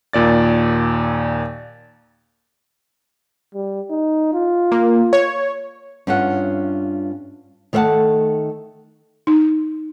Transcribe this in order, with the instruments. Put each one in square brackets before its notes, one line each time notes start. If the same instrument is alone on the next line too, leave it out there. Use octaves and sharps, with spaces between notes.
[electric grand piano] D#2 A#2 D5 A6
[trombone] G3
D#4
F4
[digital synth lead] A#3
C#5
[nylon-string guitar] G2 C#4 F4 E5 F#5
D#3 A3 C5 E5 F#5 A5
[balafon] D#4